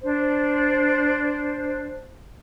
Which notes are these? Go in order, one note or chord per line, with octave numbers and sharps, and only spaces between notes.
D4 C5